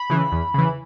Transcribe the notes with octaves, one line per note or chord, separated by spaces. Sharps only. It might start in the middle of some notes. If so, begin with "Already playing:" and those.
Already playing: B5
C#3 E3
E2
C#3 E3